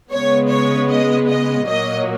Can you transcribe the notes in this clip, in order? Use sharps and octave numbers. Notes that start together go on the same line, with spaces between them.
C#3 G#3 B3 C#5
C#5
D#5
D#5
A#2 F#3 A#3 D#5